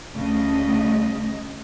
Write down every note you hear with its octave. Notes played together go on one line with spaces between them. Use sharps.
D2 C#3 G3 A3 D#5